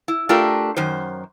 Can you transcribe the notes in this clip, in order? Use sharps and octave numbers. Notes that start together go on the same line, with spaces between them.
E4
A3 D4 F4 G4 A#4
F#2 D#3 C5